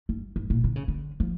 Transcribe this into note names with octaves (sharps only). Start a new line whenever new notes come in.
G2
G2
A#2
D3
C#3
D3
F3